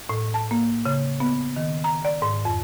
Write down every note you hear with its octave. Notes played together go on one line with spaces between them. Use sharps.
A2
A5
A#3
C#3
B3
D#3
A#5
D5
G#2
F2